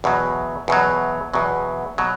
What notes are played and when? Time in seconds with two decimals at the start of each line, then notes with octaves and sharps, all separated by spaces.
0.04 E2 B2 F#3
0.68 E2 B2 F#3
1.34 E2 B2 F#3
1.98 B2 F#3